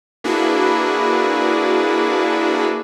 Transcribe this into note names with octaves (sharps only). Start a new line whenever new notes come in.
A#3 D4 E4 F#4 G#4 B4